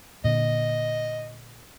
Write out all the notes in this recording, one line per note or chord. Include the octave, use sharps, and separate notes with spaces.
A#2 D3 D#5